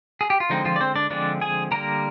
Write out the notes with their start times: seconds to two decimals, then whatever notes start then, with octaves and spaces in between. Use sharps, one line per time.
0.21 G#4
0.30 G4
0.40 F4
0.50 D3 F3 G#3 C4 D#4
0.65 F3 F4
0.76 D5
0.81 C4 C5
0.96 D4 D5
1.10 D3 F3 G#3 C4 D4 D5
1.41 G#4 G#5
1.71 D3 G3 A#3 A#4 A#5